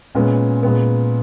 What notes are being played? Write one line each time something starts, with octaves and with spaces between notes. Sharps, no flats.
A#2 G#3 B3 C#4
A#2 G#3 B3